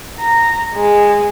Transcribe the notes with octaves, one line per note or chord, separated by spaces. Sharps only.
A#5
G#3